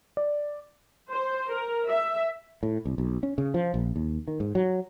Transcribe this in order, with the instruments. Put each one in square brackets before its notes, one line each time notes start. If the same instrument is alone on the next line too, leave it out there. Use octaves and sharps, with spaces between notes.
[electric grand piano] D5
[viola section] C5
A#4
E5
[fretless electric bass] A2
C2
B1
C#4
C#3
F3
A#1
D#2
D#3
G#2
F#3